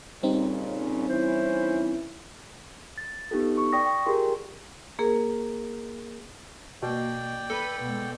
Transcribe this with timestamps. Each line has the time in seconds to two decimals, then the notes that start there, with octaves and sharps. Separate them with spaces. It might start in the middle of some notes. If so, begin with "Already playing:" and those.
0.23 A#2 C#3 G3 C4 C#4 D#4
1.10 E3 C#4 E4 C5
2.98 A6
3.31 B3 D#4 F4 G4 A4
3.57 C#6
3.73 D5 G5 C#6 D#6 A#6
3.86 G5
4.06 F4 G4 G#4 A#4 G5 C6
4.99 A#3 G#4 A#4
6.83 B2 A#3 D5 G5
7.50 A4 B4
7.82 B2 G#3